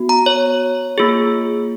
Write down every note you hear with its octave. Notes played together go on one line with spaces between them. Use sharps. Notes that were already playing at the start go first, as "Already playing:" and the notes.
Already playing: B3 F#4
A#5
C#5
A#3 F4 G#4